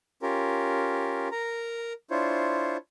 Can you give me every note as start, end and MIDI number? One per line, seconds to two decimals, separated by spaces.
0.22 1.29 61
0.22 1.29 65
0.22 1.29 67
0.22 1.29 70
1.32 1.93 70
1.32 1.93 82
2.11 2.77 62
2.11 2.77 64
2.11 2.77 65
2.11 2.77 72
2.11 2.77 73